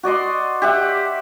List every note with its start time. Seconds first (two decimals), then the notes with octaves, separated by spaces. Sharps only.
0.03 F#4 D5 D#5 C6
0.62 G4 E5 F#5